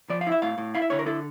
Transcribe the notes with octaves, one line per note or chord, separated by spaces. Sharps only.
F3 D5
F5
E4
E5
A2 F5
A2
E4 F5
E5
D3 C#5
A#4
E4 A4